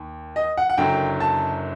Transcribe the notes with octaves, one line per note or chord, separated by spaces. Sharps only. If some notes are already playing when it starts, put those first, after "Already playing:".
Already playing: D#2
D#5
F#5
F#5
F#1 F#2 D3 F#3 G5
A5